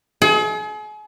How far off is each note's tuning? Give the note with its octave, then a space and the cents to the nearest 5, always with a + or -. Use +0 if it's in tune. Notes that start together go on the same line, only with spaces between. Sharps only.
G#4 +40